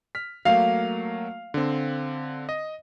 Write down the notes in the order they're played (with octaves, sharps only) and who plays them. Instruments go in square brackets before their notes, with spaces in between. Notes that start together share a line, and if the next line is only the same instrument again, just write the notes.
[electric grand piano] F6 B6
[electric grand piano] F#3 A3 A#3 [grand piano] F5
[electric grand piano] D3 C4
D#5